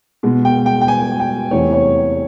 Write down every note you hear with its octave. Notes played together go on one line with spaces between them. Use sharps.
B2 G#3
G5
G5
G5
G#5
G5
E2 C3 E3 A3 C#5
C#5